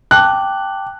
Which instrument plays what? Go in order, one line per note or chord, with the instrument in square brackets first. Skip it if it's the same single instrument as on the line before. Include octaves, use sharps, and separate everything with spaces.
[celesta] G5 A5 D6 [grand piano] F#6